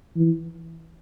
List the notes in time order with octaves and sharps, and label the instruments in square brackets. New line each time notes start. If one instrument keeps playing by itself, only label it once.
[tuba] E3